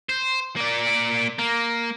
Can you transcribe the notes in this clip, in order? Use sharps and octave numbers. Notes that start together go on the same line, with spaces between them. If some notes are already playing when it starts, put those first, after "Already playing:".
C5
A#3 D5
A#3